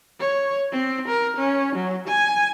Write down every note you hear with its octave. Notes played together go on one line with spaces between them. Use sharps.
C#5
C4
A#4
C#4
F#3
G#5